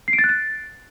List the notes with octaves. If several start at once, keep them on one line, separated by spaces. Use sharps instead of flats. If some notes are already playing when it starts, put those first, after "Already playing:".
C7
D7
A6
F#6
A6